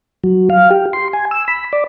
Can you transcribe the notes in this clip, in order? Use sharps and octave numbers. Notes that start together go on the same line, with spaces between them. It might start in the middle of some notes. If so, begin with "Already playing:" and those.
F#3
F5
G4
C6
G#5
E6
B5
D5